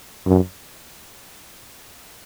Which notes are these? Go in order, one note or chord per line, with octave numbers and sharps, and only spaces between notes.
F#2